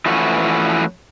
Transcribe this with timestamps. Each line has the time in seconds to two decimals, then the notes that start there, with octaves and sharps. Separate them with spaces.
0.06 E3 F3 A3 C#4 F#4 B4